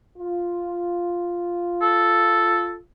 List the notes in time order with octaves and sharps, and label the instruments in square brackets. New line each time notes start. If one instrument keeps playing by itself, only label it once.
[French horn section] F4
[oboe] A4